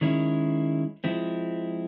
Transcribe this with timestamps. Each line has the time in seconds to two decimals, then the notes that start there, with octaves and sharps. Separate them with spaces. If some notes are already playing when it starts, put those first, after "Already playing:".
0.01 D#3 G#3 C#4 E4
1.04 F3 G#3 C4 E4